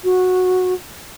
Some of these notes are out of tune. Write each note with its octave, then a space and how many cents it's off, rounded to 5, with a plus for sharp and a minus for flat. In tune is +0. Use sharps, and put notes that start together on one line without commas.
F#4 -10